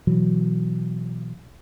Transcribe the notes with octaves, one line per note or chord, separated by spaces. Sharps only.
B2 E3 F#3